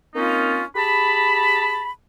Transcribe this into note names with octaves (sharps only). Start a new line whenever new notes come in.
A#3 C4 C#4 D#4 F4
G4 G#4 A5 B5